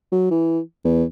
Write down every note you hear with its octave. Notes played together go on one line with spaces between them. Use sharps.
F#3
E3
E2